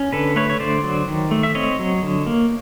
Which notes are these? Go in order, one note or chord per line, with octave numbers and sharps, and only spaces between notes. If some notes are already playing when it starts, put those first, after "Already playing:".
Already playing: C#4
D3 A4 B4
A3 B4 C#5
C#5
D3 C5 D5
F#3
D#3
A3
E5
C4 C#5 D#5
F#3
D3
A#3